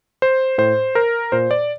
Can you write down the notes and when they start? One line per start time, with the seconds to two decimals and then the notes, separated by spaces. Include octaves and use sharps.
0.22 C5
0.58 A2 C5
0.95 A#4
1.32 A#2 C5
1.51 D5